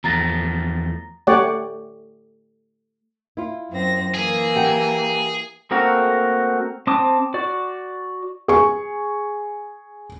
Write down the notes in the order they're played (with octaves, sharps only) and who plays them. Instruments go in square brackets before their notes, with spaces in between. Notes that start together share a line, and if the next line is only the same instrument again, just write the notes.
[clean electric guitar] E2 F3 A3 [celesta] A#5 A6 A#6
[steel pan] A3 G4 C#5 D5 F#5
[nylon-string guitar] E4 F4
[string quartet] F#2 C4 A#6
[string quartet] E3 A#3 [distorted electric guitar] G#4
[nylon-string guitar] G4 F#5 G5
[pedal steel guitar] A3 A#3 C4 F#4 A#4
C4 A5 D6 D#6
F#4 D5
[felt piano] G#4 C#6